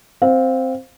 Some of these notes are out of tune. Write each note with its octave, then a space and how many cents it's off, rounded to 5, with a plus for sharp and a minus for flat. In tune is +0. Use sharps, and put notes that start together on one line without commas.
C4 +0 F5 +15